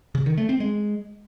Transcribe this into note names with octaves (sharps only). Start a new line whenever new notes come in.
C#3
D#3
A3
C4
G#3